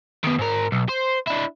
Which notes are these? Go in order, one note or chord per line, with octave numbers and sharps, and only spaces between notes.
D#3 B3
G#2 A#4
B1
C5
D4 E4